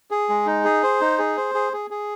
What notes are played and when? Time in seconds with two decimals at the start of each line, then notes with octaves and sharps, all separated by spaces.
0.11 G#4
0.29 G#3
0.47 D#4
0.64 G#4
0.83 C5
1.01 D#4
1.19 G#4
1.37 C5
1.55 G#4
1.73 G#4
1.91 G#4